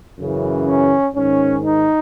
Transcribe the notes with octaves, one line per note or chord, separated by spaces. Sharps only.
F#2 C#3 E3
C#4
G#2 D#3 C#4
D#4